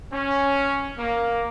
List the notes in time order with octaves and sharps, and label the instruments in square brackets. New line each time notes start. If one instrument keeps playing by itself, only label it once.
[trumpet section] C#4
A#3